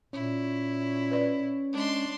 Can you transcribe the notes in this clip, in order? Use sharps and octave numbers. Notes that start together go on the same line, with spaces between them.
A#2 C#4 E4
B4 D5
G#3 D4 C6